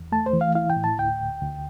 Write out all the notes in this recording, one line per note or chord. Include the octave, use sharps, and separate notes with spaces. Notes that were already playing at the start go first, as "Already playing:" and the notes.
Already playing: E2
A3 A5
C5
E3
F5
E4 F5
G5
A2
A5
D2 G5
D2
D2